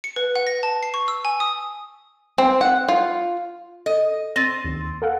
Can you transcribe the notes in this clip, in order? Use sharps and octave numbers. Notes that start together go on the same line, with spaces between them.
C#7
B4
F#5
A#6
A5
C7
C#6
E6
G#5
D#6
C4
F#5
F4
A4 D#5
C4 A6 A#6 D#7
D#2
A4 F5 F#5